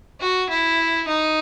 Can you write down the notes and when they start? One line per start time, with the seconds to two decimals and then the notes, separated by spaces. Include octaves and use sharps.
0.20 F#4
0.50 E4
1.08 D#4